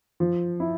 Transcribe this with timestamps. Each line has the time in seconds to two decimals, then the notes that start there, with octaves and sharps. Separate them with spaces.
0.20 F3
0.60 E4